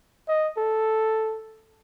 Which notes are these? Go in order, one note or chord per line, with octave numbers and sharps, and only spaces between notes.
D#5
A4